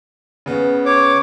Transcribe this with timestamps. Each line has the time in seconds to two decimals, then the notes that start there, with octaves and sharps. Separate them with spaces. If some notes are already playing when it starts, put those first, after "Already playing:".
0.46 C#3 B3
0.86 C#5 D6